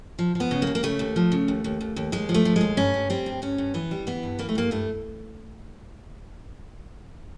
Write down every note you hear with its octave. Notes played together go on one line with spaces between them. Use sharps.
F3
F3 B3
C#3
A#3
D#2
A#3
C#3 A3
D#2
F3
C#3
D#2
D#2
D#2
D#2
D#2 G#3
F3
A3
F3
D#2 G#3
G2 C#4
G2
G3 C4
G2
G2 C#4
G2
E3 B3
G3
E3 B3
G2
E3 A#3
A3
G2 A#3
G2 A3